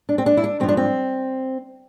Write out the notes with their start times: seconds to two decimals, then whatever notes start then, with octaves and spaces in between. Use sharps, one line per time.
0.09 D4
0.18 C4
0.26 D4
0.37 E4
0.44 D4
0.60 G2 F3 C4
0.68 D4
0.77 C4